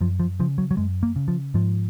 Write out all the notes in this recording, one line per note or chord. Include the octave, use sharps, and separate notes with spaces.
F#2 F3
F3
C#3 F3
F#3
F#3
F#2 G#3
A#3
C#3
F3
G#2 F3